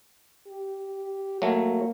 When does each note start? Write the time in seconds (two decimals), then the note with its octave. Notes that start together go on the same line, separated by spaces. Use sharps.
0.48 G4
1.42 F#3 A3 A#3